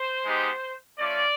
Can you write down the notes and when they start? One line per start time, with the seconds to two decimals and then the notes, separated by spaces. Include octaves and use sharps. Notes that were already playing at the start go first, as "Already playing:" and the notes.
Already playing: C5
0.24 G#3 B3 D#4 G4
0.98 A3 C#4 F4 D5